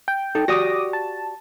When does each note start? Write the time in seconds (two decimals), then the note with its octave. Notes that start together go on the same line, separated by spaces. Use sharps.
0.08 G5
0.35 D#4 A4
0.48 F#4 G4 D5 D6 D#6 A#6
0.93 A5